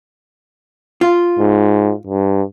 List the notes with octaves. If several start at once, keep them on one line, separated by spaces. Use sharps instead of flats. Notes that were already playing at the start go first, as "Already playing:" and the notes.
F4
G#2
G2